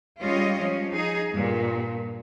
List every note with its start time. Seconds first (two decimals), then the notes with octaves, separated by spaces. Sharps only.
0.22 G3 G#3 C#4 F4 C#5 D#5
0.61 F3 C#4
0.91 D#4 G#4
1.32 G2 A#2